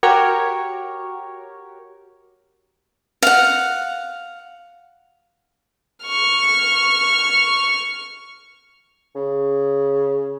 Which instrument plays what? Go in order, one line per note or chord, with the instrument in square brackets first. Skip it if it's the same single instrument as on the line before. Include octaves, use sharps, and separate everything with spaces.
[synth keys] F#4 G4 A#4 C#5
[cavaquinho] F5 F#5
[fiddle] C#6 F6
[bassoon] C#3